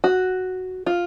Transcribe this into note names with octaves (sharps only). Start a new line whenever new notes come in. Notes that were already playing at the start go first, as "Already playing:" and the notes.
F#4
F4